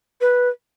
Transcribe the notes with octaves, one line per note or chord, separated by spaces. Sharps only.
B4